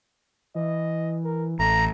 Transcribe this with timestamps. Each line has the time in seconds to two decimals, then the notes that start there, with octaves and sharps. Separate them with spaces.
0.55 E3 D#5
1.24 A#4
1.60 A1 A3 A#5